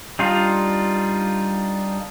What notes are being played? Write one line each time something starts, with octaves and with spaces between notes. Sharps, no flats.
G3 D4 D#4 F4